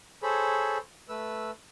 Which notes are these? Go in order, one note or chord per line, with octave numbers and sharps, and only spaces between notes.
G#4 A4 C5 C#5 B5
A3 B4 E6